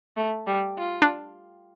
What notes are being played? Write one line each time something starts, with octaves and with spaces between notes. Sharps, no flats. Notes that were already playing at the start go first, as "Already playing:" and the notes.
A3
G3
F4
D4